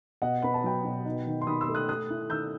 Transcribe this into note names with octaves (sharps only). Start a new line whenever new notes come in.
B2 D#5 F#5
B3 B5
A5
F#3 G5 B5
B2
D#4
D#3
C6
D#3 B5 D#6
C6 E6
A3
D#6 F#6
A3 D#6 F#6
E4
D#3 E6 G6